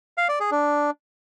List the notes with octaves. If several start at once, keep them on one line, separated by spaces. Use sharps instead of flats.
F5
D5
G#4
D4